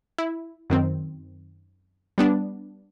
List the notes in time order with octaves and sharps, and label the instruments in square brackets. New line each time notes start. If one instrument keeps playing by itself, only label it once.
[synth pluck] E4
F#2 D#3 C4
G3 B3 D4